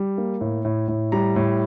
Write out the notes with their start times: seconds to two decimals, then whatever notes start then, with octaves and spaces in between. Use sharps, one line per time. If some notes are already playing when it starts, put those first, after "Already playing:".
Already playing: G3
0.18 A#3
0.41 A2
0.65 A2
0.88 A2
1.12 G3 A#5
1.36 A2